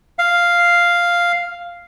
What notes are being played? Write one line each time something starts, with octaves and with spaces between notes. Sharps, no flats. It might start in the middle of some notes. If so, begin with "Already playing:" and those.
F5